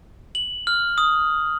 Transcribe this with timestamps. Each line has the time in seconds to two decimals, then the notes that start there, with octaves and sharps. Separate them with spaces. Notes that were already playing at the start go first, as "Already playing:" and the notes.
0.35 F#7
0.67 F6
0.98 D#6